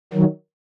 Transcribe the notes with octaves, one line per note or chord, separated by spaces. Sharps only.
D#3 F#3